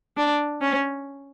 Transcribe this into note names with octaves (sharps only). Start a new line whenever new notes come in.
D4
C#4